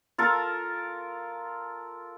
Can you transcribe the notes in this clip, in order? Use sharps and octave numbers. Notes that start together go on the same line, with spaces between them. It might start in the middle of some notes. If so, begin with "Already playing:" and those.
F4 A4 A#4